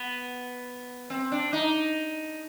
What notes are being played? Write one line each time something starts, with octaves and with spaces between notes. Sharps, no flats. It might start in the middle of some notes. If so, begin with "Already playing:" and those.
Already playing: B3
C4
D4
D#4